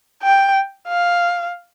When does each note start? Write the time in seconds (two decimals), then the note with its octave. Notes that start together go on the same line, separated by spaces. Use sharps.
0.23 G5
0.88 F5